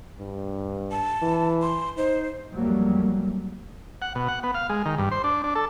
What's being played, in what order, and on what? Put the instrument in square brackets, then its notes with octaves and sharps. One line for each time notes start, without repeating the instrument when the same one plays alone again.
[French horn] G2
[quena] A5
[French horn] E3
[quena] C6
[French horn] D#4 [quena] C5
[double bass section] F2 F#3 G3 A3 A#3
[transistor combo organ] F#5
B2
F#5
B3
F5
G#3
D#3
G2
C5
D4
D4
A4